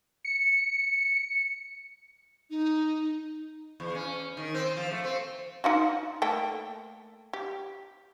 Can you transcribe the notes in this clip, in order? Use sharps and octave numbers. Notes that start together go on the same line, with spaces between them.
C#7
D#4
E2
C#4
D#3
C4
F3
A3
C4
D#4 F4 F#4
A3 A#3 G5
G4